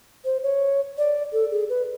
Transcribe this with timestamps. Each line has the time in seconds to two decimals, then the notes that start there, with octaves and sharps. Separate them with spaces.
0.25 C5
0.43 C#5
0.98 D5
1.33 A4
1.52 G#4
1.69 B4